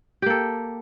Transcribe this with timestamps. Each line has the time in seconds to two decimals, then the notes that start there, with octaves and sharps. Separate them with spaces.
0.22 G4
0.26 A#3
0.30 A4